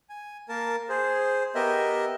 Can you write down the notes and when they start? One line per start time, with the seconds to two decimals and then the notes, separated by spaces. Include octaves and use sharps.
0.09 G#5
0.49 A#3 A#4 A5
0.89 G#4 C5
1.55 B3 G4 A#4 D#5 E5